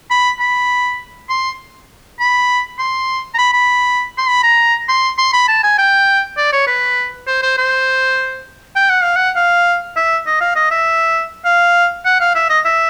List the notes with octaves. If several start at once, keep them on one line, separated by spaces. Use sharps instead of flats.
B5
B5
C6
B5
C6
A#5
B5
B5
C6
B5
A#5
C6
C6
B5
A5
G#5
G5
D5
C#5
B4
C5
C5
C5
G5
F#5
F5
F#5
F5
E5
D#5
F5
D#5
E5
F5
F#5
F5
E5
D#5
E5